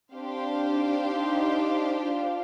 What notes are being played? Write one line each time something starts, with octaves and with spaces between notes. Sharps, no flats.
C4 D4 G4 C5 F5
D#4
F4